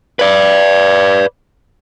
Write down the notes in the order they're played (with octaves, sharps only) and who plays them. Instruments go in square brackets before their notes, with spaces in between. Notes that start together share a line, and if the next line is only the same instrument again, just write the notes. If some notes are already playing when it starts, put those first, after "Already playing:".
[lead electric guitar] B4 D5